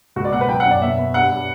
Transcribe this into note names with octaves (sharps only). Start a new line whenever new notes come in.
C#2 F#4
D5
B2 F#5
B4
F#3 G5
F#5
F#2
D5
B2 E5
B3
G2 F#5
G3